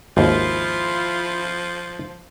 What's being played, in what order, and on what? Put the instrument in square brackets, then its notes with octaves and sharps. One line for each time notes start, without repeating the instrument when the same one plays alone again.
[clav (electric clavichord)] G#1 D#2 [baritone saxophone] F3 [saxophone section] E4 F4